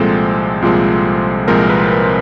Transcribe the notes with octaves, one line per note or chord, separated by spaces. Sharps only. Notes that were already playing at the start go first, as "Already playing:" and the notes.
Already playing: C2 A#2 F3 G#3 C4 A4
C2 A#2 F3 G#3 C4
C2 A#2 F3 G#3 C4 A#4
B4
B4